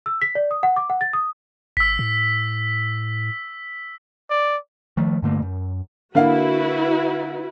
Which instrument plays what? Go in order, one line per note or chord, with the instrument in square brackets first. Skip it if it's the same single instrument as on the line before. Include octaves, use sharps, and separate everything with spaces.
[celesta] E6
B6
D5
D#6
F#5
D6
F#5
A6
D#6
[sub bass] G#1 [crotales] E6 B6
[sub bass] A2
[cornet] D5
[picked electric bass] D#3 F3 A3
G2 D3 A3 A#3
F#2
[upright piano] D3 A#3 F5 [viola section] E4 F#4 B4